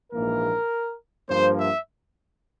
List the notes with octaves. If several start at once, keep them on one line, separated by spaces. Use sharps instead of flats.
A#1 G#2 E3 A#3 A#4
G2 F3 A#3 C5
E5